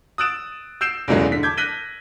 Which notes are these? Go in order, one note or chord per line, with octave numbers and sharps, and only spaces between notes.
D#6 E6 F#6 A6 D7 E7
E6 G6 C7 D7 E7
E2 G#2 C#3 F#3 G#3 A3
D3 B6
A5 D6 G6 G#6
F#6 A#6 B6 D#7 G7